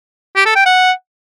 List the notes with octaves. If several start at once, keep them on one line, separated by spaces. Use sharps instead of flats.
G4
A4
G5
F#5